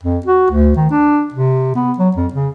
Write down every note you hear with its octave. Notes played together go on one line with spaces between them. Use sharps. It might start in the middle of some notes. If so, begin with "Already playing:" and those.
F2
F#4
D2
D#3
D4
C3
B3
F#3
F2
C#3